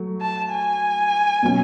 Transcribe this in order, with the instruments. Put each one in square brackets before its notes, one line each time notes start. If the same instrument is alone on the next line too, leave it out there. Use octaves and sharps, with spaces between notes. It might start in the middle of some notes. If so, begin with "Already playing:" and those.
Already playing: [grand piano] F#3 A3
[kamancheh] A5
G#5
[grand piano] B2 F#3 C#4